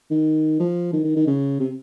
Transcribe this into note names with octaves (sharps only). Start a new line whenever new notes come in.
D#3
F3
D#3
D#3
D#3
C#3
C3